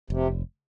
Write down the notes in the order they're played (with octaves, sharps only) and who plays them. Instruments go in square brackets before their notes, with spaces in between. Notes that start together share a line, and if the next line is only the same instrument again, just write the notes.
[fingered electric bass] F1 [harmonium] C3